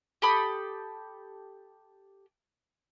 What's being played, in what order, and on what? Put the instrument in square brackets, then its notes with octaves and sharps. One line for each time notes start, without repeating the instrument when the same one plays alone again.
[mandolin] G4 A4 B5 D#6